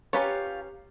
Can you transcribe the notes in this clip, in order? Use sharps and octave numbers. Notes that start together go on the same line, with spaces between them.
C#4 F4 G4 A#4 B4 C#5